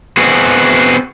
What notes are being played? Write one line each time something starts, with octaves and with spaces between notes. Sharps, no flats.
B3 C4 F#4 G#4